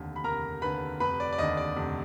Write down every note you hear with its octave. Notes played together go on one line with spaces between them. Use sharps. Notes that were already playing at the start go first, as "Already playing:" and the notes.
Already playing: F1 D#2 D3
B5
F1 A#4 A#5
D#2 D3 B4 B5
F1 B4 B5
D5
D5
D#2 D3 D#5
D5
F1